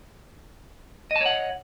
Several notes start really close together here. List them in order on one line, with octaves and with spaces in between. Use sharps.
D#5 A5 C#5 F#5